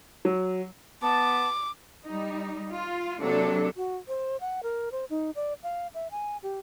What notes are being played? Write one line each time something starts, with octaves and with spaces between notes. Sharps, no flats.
F#3
B3 A5 D6
G3 D#4
F4
C3 F#3 A#3 D4 A4
F#4
C5
F#5
A#4
C5
D#4
D5
F5
E5
G#5
G4